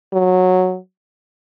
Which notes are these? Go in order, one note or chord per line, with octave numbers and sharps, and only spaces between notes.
F#3